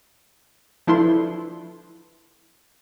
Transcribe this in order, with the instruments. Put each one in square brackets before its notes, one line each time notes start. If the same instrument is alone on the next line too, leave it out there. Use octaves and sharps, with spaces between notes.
[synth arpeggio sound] F3 D4 E4 A4 B4 C6